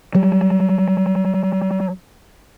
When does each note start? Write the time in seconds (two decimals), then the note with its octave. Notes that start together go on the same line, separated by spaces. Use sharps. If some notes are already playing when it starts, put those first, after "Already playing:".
0.15 F#3 G3